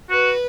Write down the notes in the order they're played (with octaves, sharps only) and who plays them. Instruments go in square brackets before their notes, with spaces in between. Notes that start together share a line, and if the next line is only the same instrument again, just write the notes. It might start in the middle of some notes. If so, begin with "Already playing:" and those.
[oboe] F#4 [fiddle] B4